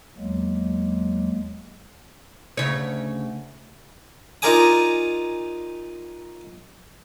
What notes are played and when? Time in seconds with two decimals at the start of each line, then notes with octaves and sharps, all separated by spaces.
0.18 E2 F#3 G#3 A#3
2.57 D2 C#3 C#5
4.42 D#4 F4 A#4 D5 G#5 D#6